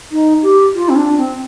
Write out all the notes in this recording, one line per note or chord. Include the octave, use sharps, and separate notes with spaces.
D#4
G4
F4
C4
D4
C4